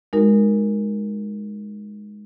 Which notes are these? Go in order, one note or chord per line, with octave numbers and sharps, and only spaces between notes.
G#3 D#4 F#4 A#4